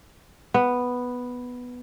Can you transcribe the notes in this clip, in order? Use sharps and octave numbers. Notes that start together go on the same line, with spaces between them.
B3